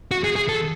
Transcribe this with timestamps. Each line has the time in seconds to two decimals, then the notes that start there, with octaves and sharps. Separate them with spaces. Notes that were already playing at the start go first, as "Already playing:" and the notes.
0.11 F#4
0.24 G#4
0.36 G#4
0.49 A4